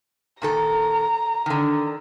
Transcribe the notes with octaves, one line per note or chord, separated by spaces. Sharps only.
A#2 D#3 A4 A#5
D3 D#3